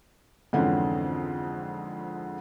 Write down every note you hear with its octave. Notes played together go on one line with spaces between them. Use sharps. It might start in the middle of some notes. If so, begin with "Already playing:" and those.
F2 G#2 D3 E3 C4 C#4